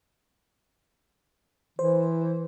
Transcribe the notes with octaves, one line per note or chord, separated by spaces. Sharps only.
E3 C5